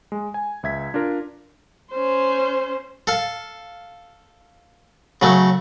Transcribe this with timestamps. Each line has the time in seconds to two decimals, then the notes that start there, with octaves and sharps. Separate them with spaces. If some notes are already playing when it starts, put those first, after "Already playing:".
0.12 G#3
0.34 G#5
0.63 C#2 E5 G#6 B6
0.94 D4 F4 A#4
1.92 C#4 C5
3.07 A4 F5
5.22 C#3 F#3 A3